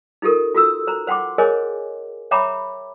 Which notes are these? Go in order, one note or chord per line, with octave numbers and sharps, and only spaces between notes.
D#4 F4 G4 A4 A#4
F4 F#4 A4 E6
C5 A#5
C5 F#5 G5 C6 D6
G#4 A#4 C5 C#5 D#5 G#5
C#5 E5 G5 A#5 B5 D6